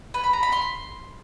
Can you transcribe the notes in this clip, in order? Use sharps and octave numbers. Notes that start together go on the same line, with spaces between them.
B4
B5
A#5
B5
C6